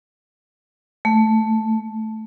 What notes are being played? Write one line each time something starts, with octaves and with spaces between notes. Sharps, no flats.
A3